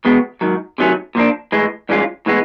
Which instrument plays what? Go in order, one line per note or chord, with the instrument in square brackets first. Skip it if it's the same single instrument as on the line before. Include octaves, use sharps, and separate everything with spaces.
[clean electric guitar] E2 B2 G#3 B3
G#2 D#3 F#3
C3 D#3 F#3 A3 C#4
A#2 F3 A#3 D4
A2 E3 G#3
G2 E3 G#3 C#4 F4
A2 E3 G#3 B3